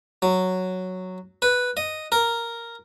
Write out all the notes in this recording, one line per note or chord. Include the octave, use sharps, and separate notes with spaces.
F#3
B4
D#5
A#4